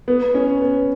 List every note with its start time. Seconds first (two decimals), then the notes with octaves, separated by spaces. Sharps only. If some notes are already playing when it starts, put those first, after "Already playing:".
0.08 B3
0.35 C#4
0.62 B3